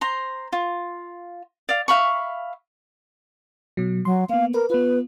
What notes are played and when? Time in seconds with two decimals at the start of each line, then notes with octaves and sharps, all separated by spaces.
0.01 C5 A#5 C6
0.53 F4
1.69 D5 F5
1.88 E5 F5 B5 C#6
3.77 B2 F#3
4.05 F#3 C6
4.29 A#3 B3 F5
4.54 A#4 B4
4.70 B3 F4 B4